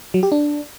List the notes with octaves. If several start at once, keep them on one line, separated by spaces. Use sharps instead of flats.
F#3
G4
D4